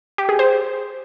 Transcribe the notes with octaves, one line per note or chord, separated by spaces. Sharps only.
G4
G#4
C5